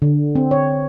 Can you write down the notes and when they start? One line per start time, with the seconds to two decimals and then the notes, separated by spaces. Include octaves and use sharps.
0.02 D3
0.35 C4
0.51 C#5